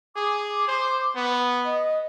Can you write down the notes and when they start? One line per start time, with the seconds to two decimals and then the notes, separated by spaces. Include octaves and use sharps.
0.16 G#4 D6
0.67 C5
1.16 B3
1.65 D#5